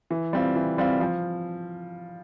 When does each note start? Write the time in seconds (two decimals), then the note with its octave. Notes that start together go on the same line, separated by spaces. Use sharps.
0.11 E3
0.33 G3 C4 F4
0.56 E3
0.78 G3 C4 F4
1.00 F3